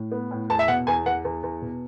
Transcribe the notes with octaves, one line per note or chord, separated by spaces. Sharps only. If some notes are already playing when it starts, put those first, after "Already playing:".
Already playing: A2
B3
A2
E2 A5
E5
B2 F#5
E2 G#5
E2 F#5
E2
E2
B2